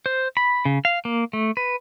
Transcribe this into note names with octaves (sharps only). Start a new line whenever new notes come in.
C5
B5
C#3
F5
A#3
A3
B4